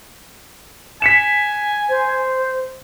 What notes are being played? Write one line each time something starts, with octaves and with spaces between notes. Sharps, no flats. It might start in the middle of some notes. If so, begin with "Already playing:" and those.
G#5 B6 C#7 E7
C5